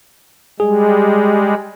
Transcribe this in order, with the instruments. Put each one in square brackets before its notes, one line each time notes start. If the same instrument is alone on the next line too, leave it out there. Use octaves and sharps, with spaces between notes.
[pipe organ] G3 G#3 [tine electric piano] G#4